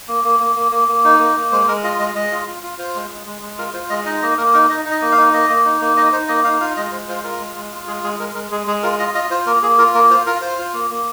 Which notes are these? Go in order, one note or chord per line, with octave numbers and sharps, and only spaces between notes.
A#3
A#3
A#3
A#3
A#3
A#3
D#4
A#3
A#3
G#3 C5
G#3 A#4
F4 D#5
G#3 D#5
G#3 D#5
F4
F4
F4
F4 C5
G#3
G#3
G#3
G#3
F4 A#4
F4 C5
G#3 D#5
D#4 D#5
A#3 D#5
A#3 A#4
D#4 A#4
D#4 D#5
D#4
D#5
A#3
F5
D#4
A#3 D#5
A#3
D#4
A#3
D#4 D#5
D#4 C5
A#3 D#5
D#4 F5
F4 F5
G#3 D#5
G#3 C5
F4 C5
F4 A#4
G#3
G#3
F4
G#3 G#4
G#3 G#4
G#3 A#4
G#3 A#4
G#3 G#4
G#3 G#4
F4 A#4
F4 D#5
F4 D#5
F4 C5
A#3 A#4
A#3 G#4
F4 A#4
A#3 A#4
F4 C5
F4 A#4
F4 C5
F4
A#3
A#3